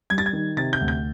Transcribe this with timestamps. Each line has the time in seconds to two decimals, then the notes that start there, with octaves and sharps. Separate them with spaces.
0.10 G3 G#6
0.18 A6
0.26 G#6
0.33 D#3
0.57 C3 A6
0.73 G6
0.81 D2
0.88 G6